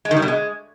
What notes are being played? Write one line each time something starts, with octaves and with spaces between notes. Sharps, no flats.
G#3
D#3
G3
B2
G#3